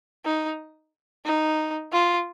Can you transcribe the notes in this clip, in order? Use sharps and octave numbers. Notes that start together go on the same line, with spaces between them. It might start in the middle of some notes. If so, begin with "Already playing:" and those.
D#4
D#4
F4